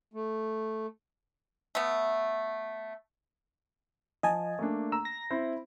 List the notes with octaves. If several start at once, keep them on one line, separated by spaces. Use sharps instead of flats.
A3
A3 B3
F3 D#5 G#5 A5
A3 A#3 D4
A#5 E6
A#6
C4 E4 C5